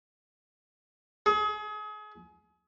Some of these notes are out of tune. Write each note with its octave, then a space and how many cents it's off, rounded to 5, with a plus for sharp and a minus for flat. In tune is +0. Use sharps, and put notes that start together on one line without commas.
G#4 +35